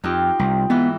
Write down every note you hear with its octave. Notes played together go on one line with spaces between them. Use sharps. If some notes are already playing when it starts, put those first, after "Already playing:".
F2 D#4 F4 G4
C2 C4
G#2 E3 B3